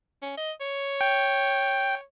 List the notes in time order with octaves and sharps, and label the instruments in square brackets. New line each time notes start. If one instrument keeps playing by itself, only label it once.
[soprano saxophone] C#4
D#5
C#5
[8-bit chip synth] G5